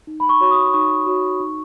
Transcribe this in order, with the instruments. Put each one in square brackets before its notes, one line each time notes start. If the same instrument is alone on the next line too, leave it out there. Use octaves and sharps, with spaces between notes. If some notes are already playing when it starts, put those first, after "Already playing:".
[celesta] D#4
B5
C#6
F#4 C#5 C#6
D#6
D#4 C#6
F#4 C#5
D#4